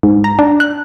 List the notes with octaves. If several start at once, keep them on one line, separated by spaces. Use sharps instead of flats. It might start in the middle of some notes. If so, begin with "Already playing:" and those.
G#2
A#5
D4
F#6